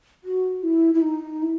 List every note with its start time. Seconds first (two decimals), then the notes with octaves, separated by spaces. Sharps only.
0.24 F#4
0.63 E4
0.94 E4
1.02 D#4
1.42 E4